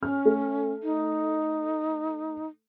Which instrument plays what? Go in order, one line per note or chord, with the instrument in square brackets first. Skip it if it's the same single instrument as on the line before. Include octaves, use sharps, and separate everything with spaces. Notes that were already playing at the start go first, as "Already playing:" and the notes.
[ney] C#4 [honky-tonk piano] F6
[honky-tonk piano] A3
[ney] D#4